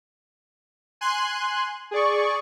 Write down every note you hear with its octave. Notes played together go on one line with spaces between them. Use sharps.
G#5 C6 F#6
G#4 D5 C#6